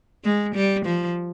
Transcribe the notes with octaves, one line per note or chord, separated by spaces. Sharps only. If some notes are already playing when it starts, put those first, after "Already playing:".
G#3
G3
F3